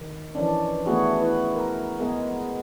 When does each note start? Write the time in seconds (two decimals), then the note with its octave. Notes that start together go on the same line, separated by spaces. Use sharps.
0.01 D#3
0.35 E3 F3 C#4 D4
0.85 E3 A3 B3 F#4 G#4 B4
1.21 E4 B4
1.55 A#4
1.99 G#3 B3 G#4 A#4